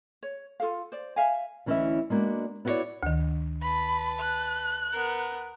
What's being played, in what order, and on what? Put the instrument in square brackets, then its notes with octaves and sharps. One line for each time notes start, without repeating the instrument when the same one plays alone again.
[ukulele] C#5
F4 A4 F5
C5 D5
E5 F5 G#5
[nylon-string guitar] D2 E3 C#4 E4 D#5 E5
G#3 A#3 B3 D4 F#4
B3 E4 F#4 G#4 C#5 D5
[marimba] D2 D#3
[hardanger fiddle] B4 A5 [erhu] B5
[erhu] F#6
[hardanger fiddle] B3 A#4